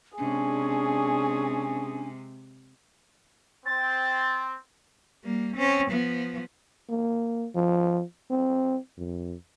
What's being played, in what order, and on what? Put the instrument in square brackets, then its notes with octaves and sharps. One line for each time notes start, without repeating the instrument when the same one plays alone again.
[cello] C3 G#3 [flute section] C#4 D4 G#5 [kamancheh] G#4
[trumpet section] C4 [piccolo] A6
[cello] G3 A#3
C4 C#4
F3 B3
[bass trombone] A#3
F3
C4
F2